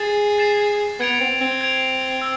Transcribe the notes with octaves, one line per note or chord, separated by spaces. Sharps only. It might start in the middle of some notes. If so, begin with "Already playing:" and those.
Already playing: G#4 A6 C7 E7
A6 C7 E7
B3 G#6 D7 F7
C4
C4
G#6 D7 F7
E6